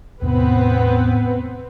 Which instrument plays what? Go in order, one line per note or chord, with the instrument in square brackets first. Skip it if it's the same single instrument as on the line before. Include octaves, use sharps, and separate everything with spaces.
[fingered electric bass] E2 A2 C3 [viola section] B3 C4 B4